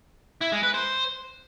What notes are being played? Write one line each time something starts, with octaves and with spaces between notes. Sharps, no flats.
E4
G#3
B4
C5